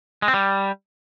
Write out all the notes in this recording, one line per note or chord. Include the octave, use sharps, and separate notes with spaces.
G#3
C4
G3